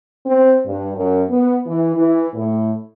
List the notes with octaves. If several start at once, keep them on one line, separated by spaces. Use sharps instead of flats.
C4
G2
F#2
B3
E3
E3
A2